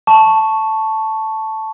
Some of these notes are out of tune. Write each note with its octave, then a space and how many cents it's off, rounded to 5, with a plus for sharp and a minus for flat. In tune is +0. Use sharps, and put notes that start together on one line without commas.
A5 +0 C#6 +0